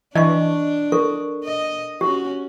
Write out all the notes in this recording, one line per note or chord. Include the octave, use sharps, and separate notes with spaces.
E3 D4 D#5 A5 C#6
A4 A#4 C#6
D#5
C#4 F#4 G4